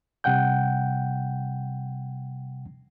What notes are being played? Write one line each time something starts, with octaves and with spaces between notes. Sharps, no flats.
C3 G3 F#5 G5 G6